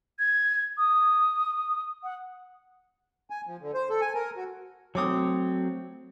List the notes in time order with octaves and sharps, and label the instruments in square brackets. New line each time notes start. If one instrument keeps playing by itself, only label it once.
[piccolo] G#6
D#6
F#5
[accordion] G#5
F3
D3
C5
A4
G#5
A#4
F#4
[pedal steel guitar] F#3 A3 C4 [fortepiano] C#5 D6 D#6